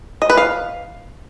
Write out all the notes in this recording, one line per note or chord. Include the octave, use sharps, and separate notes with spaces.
D#5
B4
F5